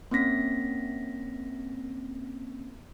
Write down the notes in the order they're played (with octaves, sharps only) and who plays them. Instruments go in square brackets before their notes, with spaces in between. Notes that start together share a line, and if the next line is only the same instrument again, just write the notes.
[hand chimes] A#3 C4 C#4 A#6 B6